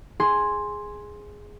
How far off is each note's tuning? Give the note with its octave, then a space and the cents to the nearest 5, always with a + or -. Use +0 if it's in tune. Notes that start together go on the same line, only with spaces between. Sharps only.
G#4 +0 C6 +5